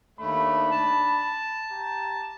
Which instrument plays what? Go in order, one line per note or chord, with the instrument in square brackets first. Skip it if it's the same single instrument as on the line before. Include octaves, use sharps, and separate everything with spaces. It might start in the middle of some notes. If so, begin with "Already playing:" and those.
[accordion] D#2 A3 [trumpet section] D4 B5
[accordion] A5
[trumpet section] G4 A#5